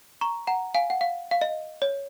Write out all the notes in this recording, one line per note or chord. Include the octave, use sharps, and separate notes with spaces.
A#5 C#6
F#5 A#5
F5 G#5
F#5
F5
F5
D#5
C#5